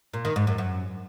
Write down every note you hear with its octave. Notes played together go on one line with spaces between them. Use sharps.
A#2
D#3
G#2
F#2
F#2